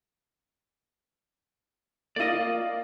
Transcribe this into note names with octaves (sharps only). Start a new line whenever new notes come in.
A#3 F4 D5 D#5